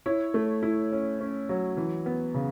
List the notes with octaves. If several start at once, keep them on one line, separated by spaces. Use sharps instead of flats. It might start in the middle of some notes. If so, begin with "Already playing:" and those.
E4 C#5
A3
E4
C#4
C#4
F#3
E3
B3
C#3